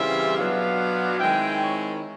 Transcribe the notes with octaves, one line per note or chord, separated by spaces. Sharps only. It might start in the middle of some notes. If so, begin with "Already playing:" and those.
Already playing: C#3 E3 G3 C4 F4 E5
B2 F#3 B3 D4 F4 F5
D#3 G#3 C4 E4 G5
C#5